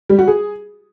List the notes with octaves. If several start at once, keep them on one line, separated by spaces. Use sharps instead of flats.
G3
F#4
G#4